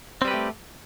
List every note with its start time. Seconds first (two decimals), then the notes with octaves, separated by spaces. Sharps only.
0.22 C4
0.25 G3
0.28 B4
0.31 G4
0.34 A3